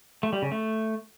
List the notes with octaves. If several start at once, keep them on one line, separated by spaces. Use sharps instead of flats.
A3
G3
C#3
A3